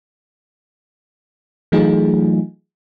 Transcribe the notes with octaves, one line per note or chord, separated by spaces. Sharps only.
E3 F#3 A3 D#4 F4 G#4